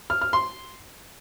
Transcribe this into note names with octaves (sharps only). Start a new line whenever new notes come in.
F6
F6
C6